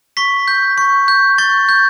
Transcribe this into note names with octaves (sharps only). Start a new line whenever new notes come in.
C#6 B6
G6
C#6
G6
C#6 A6
G6